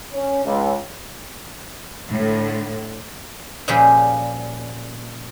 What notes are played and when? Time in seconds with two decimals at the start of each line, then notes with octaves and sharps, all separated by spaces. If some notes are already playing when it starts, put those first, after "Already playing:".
0.13 C#4
0.45 C#2
2.08 A2 D3
3.68 A#2 C#3 F3 G3 G4 G#4